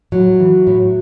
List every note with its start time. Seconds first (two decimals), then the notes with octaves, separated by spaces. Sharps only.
0.12 A2 F#3
0.40 E3
0.67 A2